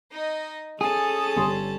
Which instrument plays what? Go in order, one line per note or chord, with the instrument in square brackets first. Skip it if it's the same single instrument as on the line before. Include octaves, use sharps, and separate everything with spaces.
[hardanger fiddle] D#4 D#5
[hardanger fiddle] C#4 A5 [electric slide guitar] G#4 [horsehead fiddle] A4
[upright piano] G1 G3 C6